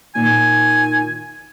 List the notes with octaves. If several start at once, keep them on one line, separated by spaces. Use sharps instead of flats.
A#2 D#3 G#5